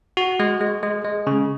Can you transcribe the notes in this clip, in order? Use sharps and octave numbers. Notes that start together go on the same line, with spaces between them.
F#4
G#3
G#3
G#3
G#3
C#3